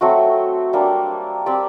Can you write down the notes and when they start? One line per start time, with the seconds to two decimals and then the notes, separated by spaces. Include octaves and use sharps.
0.01 F#3 A3 C4 F#4
0.73 G3 A#3 D4
1.46 C4 G4 D5